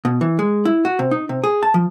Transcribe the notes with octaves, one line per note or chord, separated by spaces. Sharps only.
B2
E3
G#3
E4
F#4
C3
D#4
C3
G#4
A5
F3